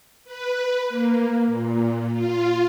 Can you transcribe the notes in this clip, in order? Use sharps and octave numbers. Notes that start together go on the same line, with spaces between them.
B4
A#3
A#2
F4